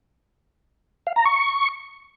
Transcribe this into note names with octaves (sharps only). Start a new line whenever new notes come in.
F5
A#5
C#6